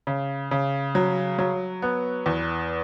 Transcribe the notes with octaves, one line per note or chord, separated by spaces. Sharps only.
C#3
C#3
F#3
F#3
B3
E2